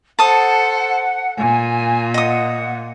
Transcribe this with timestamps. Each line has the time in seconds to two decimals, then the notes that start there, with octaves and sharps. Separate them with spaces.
0.19 A4 C5 F#5 A5 D#6
1.38 A#2 G#5
2.14 D#5 F#5 D#6